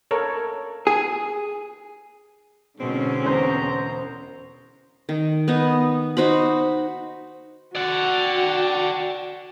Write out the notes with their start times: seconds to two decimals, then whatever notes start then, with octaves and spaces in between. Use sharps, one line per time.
0.11 A4 A#4 C#5
0.87 G#4
2.79 G#2 B2 D3 C4 C#4
3.25 E1 B3 C5 A#5 C#6
5.09 D#3
5.48 B3 D#4
6.17 D#4 F#4 C5 B5
7.75 F#4 D5 F#5 G5